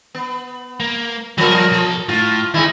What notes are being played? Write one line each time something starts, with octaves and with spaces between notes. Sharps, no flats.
B3
A#3
F3 G3 A4 A#4
B1 A4
A2 F4
G#2 D#3 D#4 E4 G#4